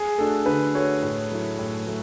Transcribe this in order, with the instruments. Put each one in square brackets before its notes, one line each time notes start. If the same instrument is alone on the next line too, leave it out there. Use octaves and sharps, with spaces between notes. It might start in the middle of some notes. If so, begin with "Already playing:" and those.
Already playing: [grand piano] G#4
[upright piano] A3 D4 F#4 [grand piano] A4
[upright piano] D3 [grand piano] B4
[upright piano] A3 D4 F#4 [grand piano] C#5
[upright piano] A2
F#3 A3 E4
A2
F#3 A3 E4